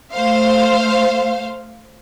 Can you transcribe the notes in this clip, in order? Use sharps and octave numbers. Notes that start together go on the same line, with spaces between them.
A3 C5 F5